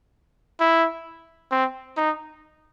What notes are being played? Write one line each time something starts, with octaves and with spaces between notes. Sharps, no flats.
E4
C4
D#4